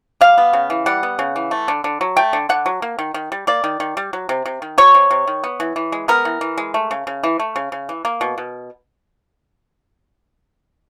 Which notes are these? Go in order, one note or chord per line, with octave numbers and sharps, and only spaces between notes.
G3 F5
B3
C#3
E3
G3 F#5
B3
C#3
E3
A3
D3
D3
F#3
A3 G5
D3
D3 F#5
F#3
A#3
D#3
D#3
G3
A#3 D5
D#3
D#3
G3
F#3
C3
C3
D#3
F#3 C#5
C3
C3
D#3
B3
E3
E3
G#3
B3 A#4
E3
E3
G#3
A3
C#3
C#3
E3
A3
C#3
C#3
E3
A#3
B2
B2